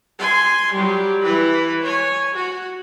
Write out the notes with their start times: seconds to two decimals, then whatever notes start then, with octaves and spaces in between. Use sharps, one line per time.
0.19 G#5 C6
0.73 F#3 G3
1.23 E3 B4
1.83 C#5 G#5
2.35 F#4